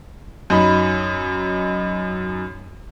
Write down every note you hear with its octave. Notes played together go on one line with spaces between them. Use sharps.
F#2 D#4 B5